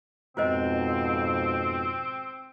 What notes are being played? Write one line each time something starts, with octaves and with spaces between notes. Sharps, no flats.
F2 G#2 B2 C4 F4 C5 D#5